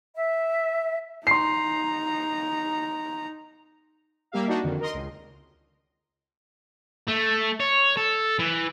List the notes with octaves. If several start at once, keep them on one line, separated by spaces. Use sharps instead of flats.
E5
D#4 A#5 C6 C7
G3 A#3 G4 E5 F5
D4 D#4 F#4
F2 D3 D#3
A#4 D#5 C6
C#2
A3
C#5
A4
E3